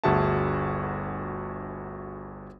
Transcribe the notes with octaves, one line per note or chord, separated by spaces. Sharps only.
G1 D2 F#4 G#4 E5 A5